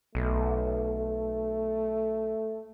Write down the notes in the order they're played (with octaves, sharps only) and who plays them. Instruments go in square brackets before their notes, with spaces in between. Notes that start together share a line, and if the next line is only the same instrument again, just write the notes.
[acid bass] B1 [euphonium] A3